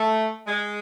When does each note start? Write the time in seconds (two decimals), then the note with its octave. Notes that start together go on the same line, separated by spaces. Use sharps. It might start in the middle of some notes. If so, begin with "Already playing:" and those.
Already playing: A3
0.46 G#3